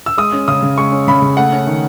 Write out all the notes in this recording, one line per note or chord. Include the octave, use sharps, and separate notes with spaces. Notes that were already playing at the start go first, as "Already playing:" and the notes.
E6
G#3 D#6
C#4
C#3 D#6
C#3
G#3 C#6
C#4
C#3 B5
C#3
A3 F#5
C#4
D#3